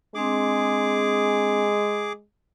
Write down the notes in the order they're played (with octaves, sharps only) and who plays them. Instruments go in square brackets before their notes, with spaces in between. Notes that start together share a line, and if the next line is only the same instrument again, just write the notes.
[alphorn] G#3 [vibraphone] C4 D4 [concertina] G#4 D6